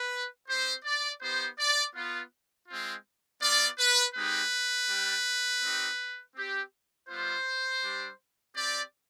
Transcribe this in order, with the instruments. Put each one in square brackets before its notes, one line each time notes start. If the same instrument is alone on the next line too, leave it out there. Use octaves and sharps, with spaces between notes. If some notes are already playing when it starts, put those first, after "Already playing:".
Already playing: [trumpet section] B4
C4 G4 C5
D5
B3 D#4 G4 C5
D5
B3 F4
G#3 C4 F4
B3 F4 D5
B4
G#3 C4 D#4 G4 B4
G3 D4 G4
C4 D#4 G4
C4 G4
G3 B3 F4 C5
G3 D4 G4
C4 G4 D5